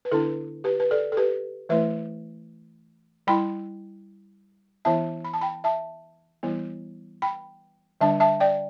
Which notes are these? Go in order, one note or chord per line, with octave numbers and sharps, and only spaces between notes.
B4
D3 B3 D4 E4 A4
G4 B4
B4
A4 D5
A4
G4 B4
E3 A3 E4 B4 E5
G3 E4 G5 B5
E3 B3 E4 E5 A5
B5
A5
G5 B5
E5 A5
E3 G3 B3 E4
G5 B5
D3 G3 D4 E5 A5
E5 A5
D5 G5